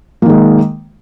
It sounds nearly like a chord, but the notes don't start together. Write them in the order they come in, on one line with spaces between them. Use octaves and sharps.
A#3 D#3 G#3